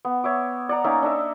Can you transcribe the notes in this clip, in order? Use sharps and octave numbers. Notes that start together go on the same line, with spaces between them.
B3
C#5 E5 D6
D5 F#5 A#5
A#3 C#4 D#4 E5
D4 D#5 E5